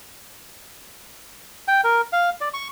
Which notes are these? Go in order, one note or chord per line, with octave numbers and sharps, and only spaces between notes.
G5
A#4
F5
D5
C#6